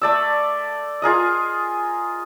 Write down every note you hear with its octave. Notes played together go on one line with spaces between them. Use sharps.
A3 D5 E6
F4 G#4 A#4 D#5